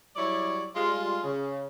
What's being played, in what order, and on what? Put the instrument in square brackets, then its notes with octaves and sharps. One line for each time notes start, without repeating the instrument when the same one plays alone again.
[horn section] F#3 G3 E4 C#5 D5
G3 G#3 F4
C#3